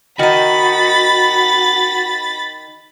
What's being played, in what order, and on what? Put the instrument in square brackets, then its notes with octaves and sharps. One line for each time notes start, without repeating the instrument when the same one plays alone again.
[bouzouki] D#3 D#4 [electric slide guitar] F#4 [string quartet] B5 A6